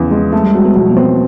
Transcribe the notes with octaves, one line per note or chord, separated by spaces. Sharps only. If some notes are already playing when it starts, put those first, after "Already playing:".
Already playing: E2 C#3 F3
G#3
F#3 A3
G3
F#3 G#3
B3
B2 F3
A#3
B3 C4